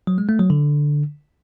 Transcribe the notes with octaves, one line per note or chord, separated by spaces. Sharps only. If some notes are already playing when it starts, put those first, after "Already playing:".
F#3
G#3
A3
F#3
D3